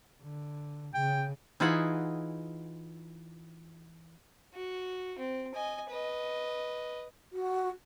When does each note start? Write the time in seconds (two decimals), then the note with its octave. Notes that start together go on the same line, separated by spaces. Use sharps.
0.22 D3
0.94 C#3 G5
1.60 E3 D#4 F4 G#4 E5 F#5
4.54 F#4
5.19 C4
5.55 D#5 G#5
5.90 B4 D#5
7.33 F#4